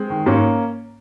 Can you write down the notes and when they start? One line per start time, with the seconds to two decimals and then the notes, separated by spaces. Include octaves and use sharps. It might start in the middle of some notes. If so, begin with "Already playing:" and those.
Already playing: G#3 C4
0.10 D#3
0.26 G#2 A#3 C#4